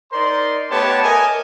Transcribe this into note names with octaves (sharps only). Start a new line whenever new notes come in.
D#4 A#4 C5 D5 C6
A3 B3 G4 B4 C#5 A5
A#4 D#5 G#5